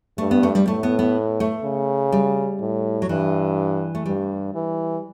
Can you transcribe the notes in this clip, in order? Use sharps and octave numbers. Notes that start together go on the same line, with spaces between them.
G2 A3
B3
A3
G3
A2 A3
B3
B3
A3
C#3
G3
A2
F#3
G2 E3
A3
G2 G3
E3